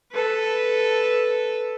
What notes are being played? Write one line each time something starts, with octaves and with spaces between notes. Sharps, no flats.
A4 B4